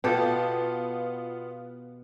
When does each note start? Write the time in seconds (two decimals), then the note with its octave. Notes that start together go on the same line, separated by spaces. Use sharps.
0.04 B2 B3 F4 G4 A4